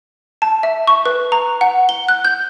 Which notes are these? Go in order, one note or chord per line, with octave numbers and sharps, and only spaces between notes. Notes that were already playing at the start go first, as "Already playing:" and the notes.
A5
E5
C#6
B4
A#5
F#5
G7
F#6
G6